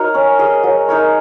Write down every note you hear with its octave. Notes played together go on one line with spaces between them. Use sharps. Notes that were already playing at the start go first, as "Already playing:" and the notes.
Already playing: D#4 F#4 A#4 C#5
C#4
G#4 D#5
F#3
D#4 A#4 C#5